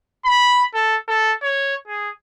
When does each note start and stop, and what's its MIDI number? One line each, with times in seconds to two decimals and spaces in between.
0.25 0.64 83
0.74 0.97 69
1.08 1.34 69
1.43 1.75 73
1.88 2.10 68